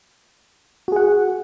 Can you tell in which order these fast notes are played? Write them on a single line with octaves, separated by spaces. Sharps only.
F#4 G#4 F#5